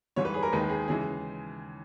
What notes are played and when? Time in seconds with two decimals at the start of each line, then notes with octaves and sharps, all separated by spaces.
0.16 G#2 E3 G3 C#5
0.25 B4
0.34 G#4
0.43 A#4
0.52 D#2 D#3 G#3 B4
0.69 G#4
0.88 C#3 E3 G#3 G#4